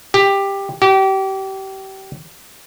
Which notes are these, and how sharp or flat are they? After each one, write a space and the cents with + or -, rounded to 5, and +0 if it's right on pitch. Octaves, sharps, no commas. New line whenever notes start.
G4 +10
G4 -30